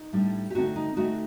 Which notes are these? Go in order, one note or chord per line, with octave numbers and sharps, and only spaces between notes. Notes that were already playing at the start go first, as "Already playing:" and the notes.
Already playing: D#4
A2 G3 D4
G4
D3 A3 C4 D#4 F#4
D#4
D3 A3 C4 D#4 F#4